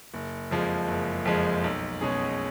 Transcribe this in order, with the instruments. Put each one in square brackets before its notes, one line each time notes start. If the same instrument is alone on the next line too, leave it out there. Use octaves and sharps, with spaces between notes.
[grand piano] F#1
F2 F3 G#3
F#1
F2 F3 G#3
B1
B2 G#3 C#4 G#4